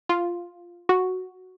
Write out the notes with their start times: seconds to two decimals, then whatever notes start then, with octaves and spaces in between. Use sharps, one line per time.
0.09 F4
0.89 F#4